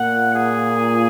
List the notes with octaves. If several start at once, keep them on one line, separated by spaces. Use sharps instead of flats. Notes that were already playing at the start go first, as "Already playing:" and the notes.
Already playing: A#2 A#3 F#5
G#4